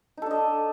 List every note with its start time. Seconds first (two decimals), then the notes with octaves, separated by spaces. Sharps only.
0.17 D#4
0.22 A4
0.26 D4
0.31 D#5